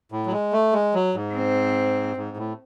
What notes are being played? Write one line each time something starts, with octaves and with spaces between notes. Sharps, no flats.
A2
F#3
G#3
A3
G#3
F#3
G#2
C4
G#2
A2